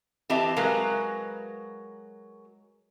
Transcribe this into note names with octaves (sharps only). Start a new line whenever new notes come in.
E3 C4 G4 D#5 E5 A5
F#3 G#3 A#4 B4 F5